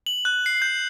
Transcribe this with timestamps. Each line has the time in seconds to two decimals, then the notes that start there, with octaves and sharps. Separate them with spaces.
0.06 F#7
0.25 F#6
0.46 C7
0.62 G6